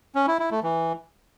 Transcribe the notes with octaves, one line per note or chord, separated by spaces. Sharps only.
C#4
E4
E4
A3
E3